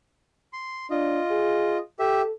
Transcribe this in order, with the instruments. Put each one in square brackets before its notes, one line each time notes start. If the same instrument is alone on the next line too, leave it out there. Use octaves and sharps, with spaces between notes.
[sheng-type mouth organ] C6
[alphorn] D4 [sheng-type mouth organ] F4 D#5
[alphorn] G#4
[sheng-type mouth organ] G4 E5 [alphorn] A4